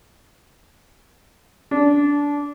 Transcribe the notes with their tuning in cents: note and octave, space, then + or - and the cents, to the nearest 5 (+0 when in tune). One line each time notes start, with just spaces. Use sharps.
D4 -20